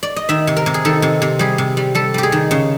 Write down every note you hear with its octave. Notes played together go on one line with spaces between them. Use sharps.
D5
D#5
D#3 E5
C3
A#4
C3
G#4
D#3 A4
C3
C3
G3 G#4
C3
G3
G3 A4
G3 G4
G#4
D#3
C#3